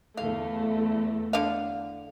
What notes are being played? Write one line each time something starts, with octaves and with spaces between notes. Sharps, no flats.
E2 A3 F5
D3 F5